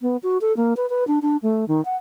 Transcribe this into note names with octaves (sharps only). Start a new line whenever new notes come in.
B3
F#4
A4
A#3
B4
B4
D4
D4
A3
D#3
F#5